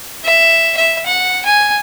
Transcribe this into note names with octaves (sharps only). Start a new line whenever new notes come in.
E5
E5
F#5
G#5